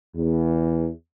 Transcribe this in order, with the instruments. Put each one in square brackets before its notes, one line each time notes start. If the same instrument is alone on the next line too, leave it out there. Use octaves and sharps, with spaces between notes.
[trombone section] E2